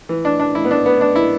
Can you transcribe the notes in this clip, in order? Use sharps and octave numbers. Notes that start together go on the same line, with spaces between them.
E3
D4
D4
E4
B3
D4
B3
D4
E4